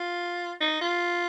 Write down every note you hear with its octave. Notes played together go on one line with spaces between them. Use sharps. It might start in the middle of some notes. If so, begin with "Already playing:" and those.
Already playing: F4
D#4
F4